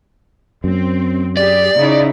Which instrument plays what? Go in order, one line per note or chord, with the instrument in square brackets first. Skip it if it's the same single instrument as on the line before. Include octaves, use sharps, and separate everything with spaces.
[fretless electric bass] F#2 [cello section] C4
[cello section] G4 G#4 [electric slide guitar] D5
[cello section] C#3 D#4 E4